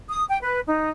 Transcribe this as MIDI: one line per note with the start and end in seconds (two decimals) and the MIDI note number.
0.08 0.24 87
0.28 0.38 79
0.41 0.60 71
0.66 0.90 63